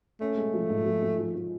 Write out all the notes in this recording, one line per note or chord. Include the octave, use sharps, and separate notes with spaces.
A3 C#4
G#3
F3
G#2
F3
F3
F3
F3